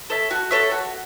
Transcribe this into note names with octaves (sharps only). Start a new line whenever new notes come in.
A4 C#5 E5
F#4
A4 C#5 E5
F#4